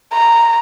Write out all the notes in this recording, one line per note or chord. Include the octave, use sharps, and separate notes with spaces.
A#5